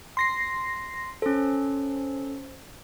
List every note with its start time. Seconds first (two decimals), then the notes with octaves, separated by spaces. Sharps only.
0.17 C6 A#6 C7
1.22 C#4 A4 C5